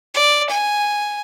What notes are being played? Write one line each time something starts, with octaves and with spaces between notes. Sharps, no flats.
D5
G#5